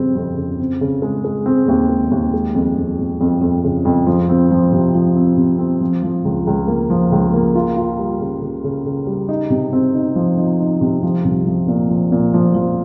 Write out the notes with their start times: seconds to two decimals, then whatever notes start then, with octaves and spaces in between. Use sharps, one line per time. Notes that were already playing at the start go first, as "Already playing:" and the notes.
Already playing: F2 C#3 G3 C4
0.15 F2
0.37 C#3
0.60 C4
0.81 C#3
1.02 G#3
1.24 G#3
1.46 C4
1.68 D#2
1.90 G#3
2.11 D#2
2.34 G#3
2.55 F2
2.77 F2
2.99 F2
3.21 F2
3.41 F2
3.64 C#3
3.85 F2
4.07 F3
4.29 C4
4.51 F3
4.72 C3
4.95 F3
5.16 C4
5.37 C3
5.59 C4
5.81 F3
6.03 F3
6.25 C#2
6.47 C#2
6.68 A#3
6.90 F3
7.12 C#2
7.34 A#3
7.55 F4
7.77 F4
7.99 G3
8.21 C#3
8.42 C#3
8.64 C#3
8.86 C#3
9.07 G3
9.29 D#4
9.50 C3
9.73 C4
9.95 D#4
10.16 F3
10.38 D#4
10.60 D#4
10.81 C3
11.03 F3
11.24 C2
11.47 F3
11.68 A#2
11.90 F3
12.12 A#2
12.34 F3
12.55 F3